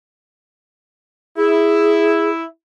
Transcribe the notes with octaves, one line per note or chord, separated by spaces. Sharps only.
E4 G#4